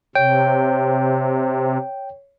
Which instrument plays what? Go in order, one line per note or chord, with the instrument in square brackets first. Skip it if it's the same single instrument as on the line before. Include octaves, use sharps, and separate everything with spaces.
[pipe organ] C3 [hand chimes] C#5 [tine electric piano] G5